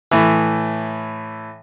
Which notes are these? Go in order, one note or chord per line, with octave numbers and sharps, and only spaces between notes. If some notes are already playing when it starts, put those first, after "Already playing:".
A2 E3